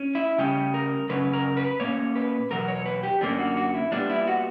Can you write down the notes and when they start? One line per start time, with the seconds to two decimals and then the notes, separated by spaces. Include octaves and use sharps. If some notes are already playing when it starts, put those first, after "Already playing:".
Already playing: C#4
0.15 E4
0.38 C#3 G3 C#4 G4
0.74 A#4
1.09 F#2 C#3 F#3 C#4 B4
1.33 A#4
1.57 B4
1.80 A#2 A#3 C#4 C#5
2.16 B4
2.51 E2 B2 F#3 A#4
2.68 C#5
2.86 B4
3.03 G4
3.21 F#2 D3 A#3 C#4 D4
3.39 F#4
3.57 F#4
3.74 E4
3.92 A#2 G3 B3 D4
4.10 E4
4.27 F#4